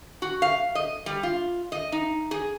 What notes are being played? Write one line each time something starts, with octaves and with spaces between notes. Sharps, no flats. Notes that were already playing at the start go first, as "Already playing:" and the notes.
F#4
F5
D#5
G3
F4
D#5
D#4
G#4